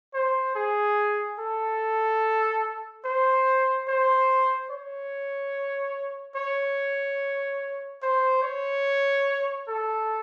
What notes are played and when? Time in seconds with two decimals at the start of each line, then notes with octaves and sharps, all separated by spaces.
0.14 C5
0.55 G#4
1.39 A4
3.05 C5
3.88 C5
4.70 C#5
6.36 C#5
8.02 C5
8.43 C#5
9.68 A4